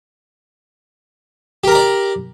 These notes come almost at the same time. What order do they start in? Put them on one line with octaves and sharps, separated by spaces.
G4 A#4 A#5 D5